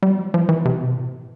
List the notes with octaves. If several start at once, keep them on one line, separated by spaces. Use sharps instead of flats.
G3
F3
F3
E3
C3
B2
A2